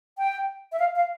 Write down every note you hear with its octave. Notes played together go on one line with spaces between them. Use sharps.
G5
E5
F5
F5